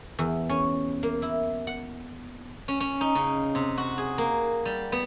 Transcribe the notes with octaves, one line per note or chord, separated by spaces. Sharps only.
E2
C#4
A#3
E4
F#5
C#4
C#4
D#4
C#3
C3
F#4
G#4
A#3
G3
B3